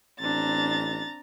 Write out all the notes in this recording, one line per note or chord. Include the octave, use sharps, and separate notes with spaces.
A1 C4 D4 A#5 A6